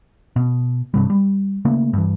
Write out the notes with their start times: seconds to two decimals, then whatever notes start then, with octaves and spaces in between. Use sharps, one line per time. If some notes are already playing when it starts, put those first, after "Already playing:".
0.36 B2
0.94 G2 C3 G3
1.10 G3
1.65 C#3 A3 A#3
1.93 G2 E3